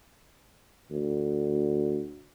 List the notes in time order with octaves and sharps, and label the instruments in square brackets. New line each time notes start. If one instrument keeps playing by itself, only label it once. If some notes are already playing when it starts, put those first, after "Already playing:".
[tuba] D2